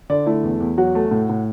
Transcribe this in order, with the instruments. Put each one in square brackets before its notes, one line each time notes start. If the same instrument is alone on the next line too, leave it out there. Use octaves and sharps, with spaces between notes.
[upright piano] D3 D5
A3 E4
E2
E2
F#3 F#4
A3
A2
A2